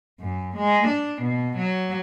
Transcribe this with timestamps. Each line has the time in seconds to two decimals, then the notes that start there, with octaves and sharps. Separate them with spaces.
0.21 F#2
0.57 G#3
0.87 D4
1.22 B2
1.57 F#3